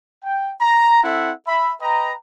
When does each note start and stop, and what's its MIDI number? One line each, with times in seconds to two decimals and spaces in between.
0.24 0.51 79
0.61 1.02 82
1.03 1.31 60
1.03 1.31 64
1.03 1.31 69
1.03 1.31 76
1.03 1.31 78
1.47 1.73 76
1.47 1.73 83
1.80 2.12 71
1.80 2.12 75
1.80 2.12 79
1.80 2.12 82